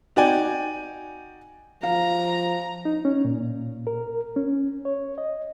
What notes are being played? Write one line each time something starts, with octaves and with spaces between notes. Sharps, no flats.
D#4 F#4 D5 G5 G#5
F3 F5 A#5
D#4
C#4
A#2
A#4
C#4
C#5
D#5